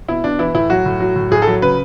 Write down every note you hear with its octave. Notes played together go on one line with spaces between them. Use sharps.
B2 E4
B2 D4
E3 E4
A2 E4
F#3 F#4
A2
F#3
A2
A2 G#4
A4
F#3
C#3 B4